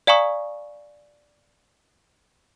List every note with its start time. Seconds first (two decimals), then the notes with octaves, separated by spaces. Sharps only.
0.07 D5 F5 G#5 A#5 C#6 D#6